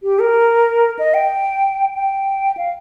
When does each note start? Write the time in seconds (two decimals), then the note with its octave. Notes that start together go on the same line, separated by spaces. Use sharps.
0.03 G4
0.19 A#4
0.99 D#5
1.14 G5
1.94 G5
2.57 F5